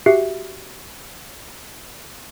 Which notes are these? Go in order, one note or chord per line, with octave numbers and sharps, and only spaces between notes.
F#4 G4 E5 F#6 C7 C#7